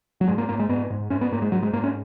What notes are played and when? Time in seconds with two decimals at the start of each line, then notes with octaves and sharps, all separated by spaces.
0.21 F#3
0.28 G#2 G#3
0.38 A#3
0.49 G#2 A#3
0.59 G#3
0.69 G#2 B3
0.90 G#2
1.10 G#2 C#4
1.21 B3
1.32 G#2 A#3
1.42 G#3
1.52 G#2 F#3
1.63 G#3
1.73 G#2 A#3
1.84 C#4